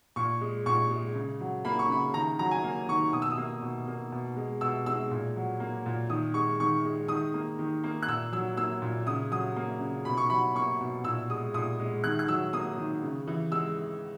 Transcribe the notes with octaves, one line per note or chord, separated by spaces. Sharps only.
A#2 C#6
G#3
A#2 C#6
G#3
C#3
F#3
A#3 B5
C#6
C#3 B5
D#3 A#5
F#3 A#5
G#5
A#3
D#3 C#6
B2 D#6
E6
D#6
A#3
B2
A#3
B2
G#3
B2 E6
G#3 E6
A#2
F#3
A#3
A#2
D#3 D#6
G#3 C#6
D#3 C#6
G#3
D#3 D#6
A#3
D#3
A#3
F#6
A#2 E6
F#3 E6
A#3 E6
A#2
C#3 D#6
F#3 D#6
A#3
C#3
B2 B5
C#6
F#3 B5
A#3 C#6
B2
A#2 E6
G#3 D#6
A#2 D#6
G#3
D#3 F#6
F#6
F#3 E6
A#3 D#6
D#3
C#3
E3
G#3 E6